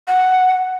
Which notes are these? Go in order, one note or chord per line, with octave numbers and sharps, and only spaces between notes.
F#5